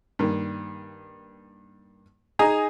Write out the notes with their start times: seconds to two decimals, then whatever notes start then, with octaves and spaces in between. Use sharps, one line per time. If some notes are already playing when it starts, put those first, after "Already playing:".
0.19 G2 D#3 A#3
2.39 D#4 G#4 G#5 A#5 D#6